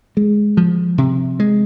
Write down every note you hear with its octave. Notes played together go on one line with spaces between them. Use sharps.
G#3
F3
C3
G#3